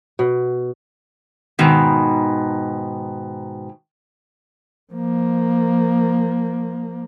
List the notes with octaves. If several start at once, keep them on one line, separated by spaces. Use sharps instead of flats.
B2
G#2 B2 D#3
F3 A#3